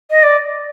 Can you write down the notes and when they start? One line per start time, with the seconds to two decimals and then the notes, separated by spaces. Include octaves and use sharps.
0.10 D#5
0.23 D5